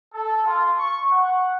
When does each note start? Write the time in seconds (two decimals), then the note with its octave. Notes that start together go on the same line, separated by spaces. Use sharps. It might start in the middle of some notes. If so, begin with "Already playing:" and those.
0.14 A4
0.45 F4
0.79 C#6
1.12 F#5